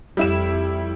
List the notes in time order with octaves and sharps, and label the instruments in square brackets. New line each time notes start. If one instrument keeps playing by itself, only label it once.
[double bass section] F2 [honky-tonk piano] G3 E4 E7